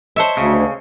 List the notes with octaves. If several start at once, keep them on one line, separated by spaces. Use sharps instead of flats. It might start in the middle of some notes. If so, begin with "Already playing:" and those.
C5 C#5 D#5 E5 A5
D2 C#3